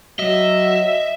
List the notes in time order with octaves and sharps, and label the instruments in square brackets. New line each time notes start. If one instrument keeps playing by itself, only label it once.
[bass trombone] F#3 [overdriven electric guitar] D#5 [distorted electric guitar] E5